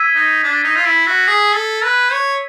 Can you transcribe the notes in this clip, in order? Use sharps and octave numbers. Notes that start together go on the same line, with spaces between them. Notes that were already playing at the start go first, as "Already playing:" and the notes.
Already playing: E6 G#6 B6 D#7
D#4
D4
D#4
F4
E4
F#4
G#4
A4
B4
C#5